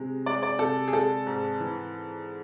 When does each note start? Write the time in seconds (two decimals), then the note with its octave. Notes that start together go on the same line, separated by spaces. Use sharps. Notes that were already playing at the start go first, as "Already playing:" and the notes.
Already playing: C3 G#3
0.26 G#3 D5
0.43 D5
0.59 C3 A4
0.88 G#4
0.93 G#3 A4
1.26 G#2
1.60 E3